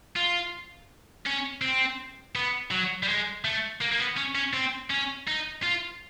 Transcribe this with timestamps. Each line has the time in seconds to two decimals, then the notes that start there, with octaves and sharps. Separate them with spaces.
0.16 F4
1.26 C#4
1.62 C4
2.36 B3
2.71 F#3
3.03 G3
3.08 G#3
3.45 A3
3.81 A#3
3.92 A#3
3.99 B3
4.17 C#4
4.35 C#4
4.53 C4
4.90 C#4
5.27 D#4
5.63 F4